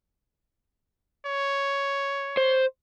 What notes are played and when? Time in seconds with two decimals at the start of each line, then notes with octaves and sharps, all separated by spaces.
1.26 C#5
2.37 C5